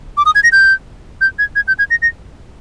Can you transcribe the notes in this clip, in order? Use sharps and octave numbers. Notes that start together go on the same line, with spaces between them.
D6
D#6
G#6
A#6
G6
G6
G#6
G#6
G6
G#6
A#6
A#6